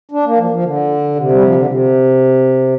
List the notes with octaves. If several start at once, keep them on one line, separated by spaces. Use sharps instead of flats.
D4
A#3
F3
F3
D3
C3
G3
F3
D3
C3